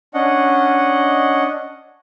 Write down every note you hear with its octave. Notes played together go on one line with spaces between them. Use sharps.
C#4 D4 D#5 F#5